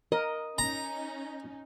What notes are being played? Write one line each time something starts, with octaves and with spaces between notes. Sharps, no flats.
A#4 D#5
C#4 D#4 A#5